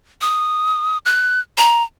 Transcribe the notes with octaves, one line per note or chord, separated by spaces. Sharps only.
D#6
F#6
A#5